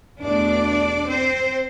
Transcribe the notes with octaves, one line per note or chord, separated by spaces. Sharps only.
E2 B2 A3 D4 D5
C4 C5